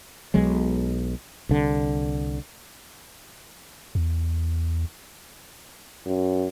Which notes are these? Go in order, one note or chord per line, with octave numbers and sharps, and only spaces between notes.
B1 B2 F#3 G#3
C2 D3
E2
F#2